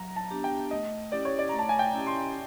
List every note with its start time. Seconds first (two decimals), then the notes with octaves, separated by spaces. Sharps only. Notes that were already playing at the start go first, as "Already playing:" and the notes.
Already playing: F#3 A#5
0.16 A5
0.30 B3 D4 G4
0.44 G5
0.71 A3 D#5
1.12 C#4 E4 G4 D5
1.25 C#5
1.39 D5
1.49 A3 A#5
1.59 A5
1.69 G#5
1.79 G5
1.93 C#4 E4 G4
2.07 C6